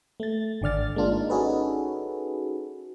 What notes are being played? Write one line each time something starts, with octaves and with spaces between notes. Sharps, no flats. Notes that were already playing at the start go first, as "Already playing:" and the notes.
A3 A6
G#1 D3 D5 F6 A6
G#3 A#3 D4 F4
D#4
C#4 D#4 F#4 G#4 A4 B4